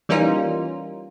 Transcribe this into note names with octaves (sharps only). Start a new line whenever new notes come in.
E3 G3 A#3 C#4 D#4 F4